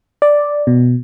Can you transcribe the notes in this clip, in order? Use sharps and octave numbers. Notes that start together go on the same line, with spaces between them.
D5
B2